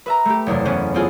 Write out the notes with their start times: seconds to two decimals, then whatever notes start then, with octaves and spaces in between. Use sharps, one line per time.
0.06 B4 E5 A#5
0.25 A3 G4
0.46 F#1 E2 C3 D4
0.65 E3 B3 C#4 B4 C5
0.94 B3 C4 F4 G#4 A4